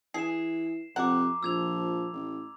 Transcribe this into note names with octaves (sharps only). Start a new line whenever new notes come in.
E3 G#4 C7 E7
F2 C3 F#5 A#5 D6
A#1 F3 E6 G#6 F7
A1